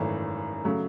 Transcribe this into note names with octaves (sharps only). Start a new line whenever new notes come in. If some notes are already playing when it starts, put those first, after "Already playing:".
Already playing: G#1 F#2 C#3 E3 A3
C#3 F#3 A3